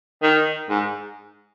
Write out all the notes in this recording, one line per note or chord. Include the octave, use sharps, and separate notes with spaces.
D#3
G#2